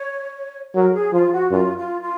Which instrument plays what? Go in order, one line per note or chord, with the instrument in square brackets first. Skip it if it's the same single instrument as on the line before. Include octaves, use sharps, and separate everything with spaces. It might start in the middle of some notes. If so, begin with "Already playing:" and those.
Already playing: [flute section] C#5
[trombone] F#3 [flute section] A#4
[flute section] G#4
[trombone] F3 [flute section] F4
[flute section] F#4
[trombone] F#2 [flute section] F4
[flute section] F4
F4